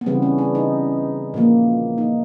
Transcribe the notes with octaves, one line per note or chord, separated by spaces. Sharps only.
B3
C#3 E3 G3 C4
C#4
D4
D#4
A#2 F3 A#3
D#4